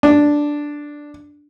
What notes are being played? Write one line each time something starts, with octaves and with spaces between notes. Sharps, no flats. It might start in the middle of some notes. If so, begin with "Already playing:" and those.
D4